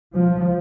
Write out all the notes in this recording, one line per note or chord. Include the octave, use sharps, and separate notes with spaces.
F3